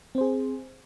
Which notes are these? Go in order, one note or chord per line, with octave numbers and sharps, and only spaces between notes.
C4 G#4 C5